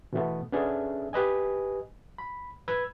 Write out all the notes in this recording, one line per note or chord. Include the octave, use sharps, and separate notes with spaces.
B2 E3 A3 B3
B3 C#4 D4 G#4 A4 E5
G4 B4 D#5 G#5
B5
B4 B5 E6 G#6